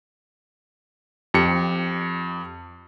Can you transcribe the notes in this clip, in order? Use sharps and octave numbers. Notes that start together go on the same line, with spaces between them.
F2 G4 C#7